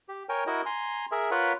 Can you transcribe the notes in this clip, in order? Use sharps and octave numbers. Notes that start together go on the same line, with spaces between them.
G4
A#4 C#5 G5 G#5
E4 F#4 A#4 D#5
G#5 A#5 C6
G#4 A#4 E5
F4 A#4 B4 C#5 F#5 B5